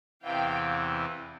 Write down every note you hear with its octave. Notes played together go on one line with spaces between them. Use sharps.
E2 C3 E3 F5 G5